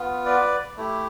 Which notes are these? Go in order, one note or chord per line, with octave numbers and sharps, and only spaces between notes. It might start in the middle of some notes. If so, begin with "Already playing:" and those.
Already playing: B3 F4
B4 D5
A3 E4 G4